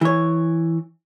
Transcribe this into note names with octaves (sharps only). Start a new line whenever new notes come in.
E3 C#5